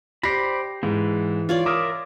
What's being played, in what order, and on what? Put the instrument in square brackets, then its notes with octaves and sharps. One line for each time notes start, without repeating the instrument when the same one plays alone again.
[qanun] G4 [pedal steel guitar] C5 D5 B5 [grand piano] A#6 C7
[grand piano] G#2 [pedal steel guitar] E3
[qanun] F4 C#5 D5
[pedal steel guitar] A#4 E5 [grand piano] D6 D#6 F6